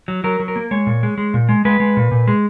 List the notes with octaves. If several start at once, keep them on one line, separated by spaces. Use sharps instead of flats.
F#3
F#3 A#4
F#3
A#4
A#3
G#3 C#5
A#2
G#3
G#3
A#2
G#3
G#3 B4
G#3
A#2
A#2
G#3